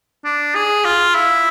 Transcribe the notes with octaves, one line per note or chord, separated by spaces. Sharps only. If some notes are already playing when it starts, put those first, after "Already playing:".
D4
G#4
F4
E4